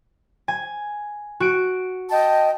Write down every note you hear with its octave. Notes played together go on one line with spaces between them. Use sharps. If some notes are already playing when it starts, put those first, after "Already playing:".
G#5
F#4 D7
D#5 G5 A5